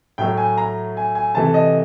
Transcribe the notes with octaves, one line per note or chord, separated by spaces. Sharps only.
A2 F#3 A3 G5
G#5
A#5
G#5
G#5
C3 E3 A3 A5
D#5